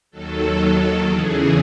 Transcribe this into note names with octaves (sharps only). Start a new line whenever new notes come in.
D#2 D#3 F#3 A4
E2 C#3 E3 G#4